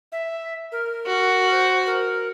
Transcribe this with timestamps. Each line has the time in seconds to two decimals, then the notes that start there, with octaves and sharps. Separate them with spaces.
0.12 E5
0.72 A#4
1.06 F#4
1.51 C5
1.86 A#4